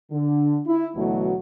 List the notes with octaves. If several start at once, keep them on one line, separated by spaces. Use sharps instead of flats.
D3
E4
D2 B2 E3 F#3 A3